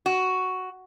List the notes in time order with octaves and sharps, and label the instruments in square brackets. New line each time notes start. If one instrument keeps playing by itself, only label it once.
[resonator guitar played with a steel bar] F#4